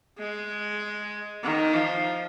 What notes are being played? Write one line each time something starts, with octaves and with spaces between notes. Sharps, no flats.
G#3
D#3
F3